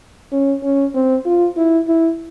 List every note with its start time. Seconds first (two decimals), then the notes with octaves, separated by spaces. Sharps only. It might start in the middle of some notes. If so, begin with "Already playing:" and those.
0.32 C#4
0.63 C#4
0.94 C4
1.25 F4
1.57 E4
1.88 E4